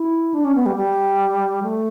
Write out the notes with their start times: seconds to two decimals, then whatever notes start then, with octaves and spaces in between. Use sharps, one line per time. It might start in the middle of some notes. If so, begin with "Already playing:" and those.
Already playing: E4
0.34 D4
0.45 C#4
0.55 B3
0.66 G3
0.76 G3
1.63 A3